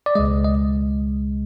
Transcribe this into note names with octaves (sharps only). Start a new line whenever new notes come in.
D5
C#2 B2 G#3 D#5
D#5